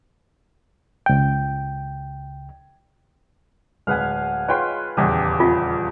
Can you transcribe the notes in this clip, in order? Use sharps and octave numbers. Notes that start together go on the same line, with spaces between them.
C#2 G5
D1 G#3 B4 F5 F#5 G#5
G#3 F4 B4 C#5 G5 C6
D#1 E2 C#3 G4 D#5 G#5
F4